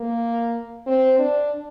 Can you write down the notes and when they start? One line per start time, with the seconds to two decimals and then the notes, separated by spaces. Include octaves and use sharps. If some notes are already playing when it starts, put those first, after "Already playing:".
Already playing: A#3
0.87 C4
1.19 D4